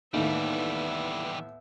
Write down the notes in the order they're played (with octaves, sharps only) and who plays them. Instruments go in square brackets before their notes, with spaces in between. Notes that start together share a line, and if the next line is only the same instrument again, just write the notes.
[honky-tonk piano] D#2 A2 [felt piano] D#3 [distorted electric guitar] E3 G3 [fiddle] B3 E5